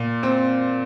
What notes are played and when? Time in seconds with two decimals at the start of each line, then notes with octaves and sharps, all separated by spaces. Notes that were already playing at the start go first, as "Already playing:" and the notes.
Already playing: A#2
0.23 C4